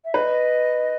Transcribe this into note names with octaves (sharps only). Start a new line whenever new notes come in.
E5
B4 D#5